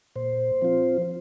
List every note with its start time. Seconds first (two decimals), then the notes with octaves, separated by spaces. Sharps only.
0.16 A#2 C5
0.62 F3 C4 F4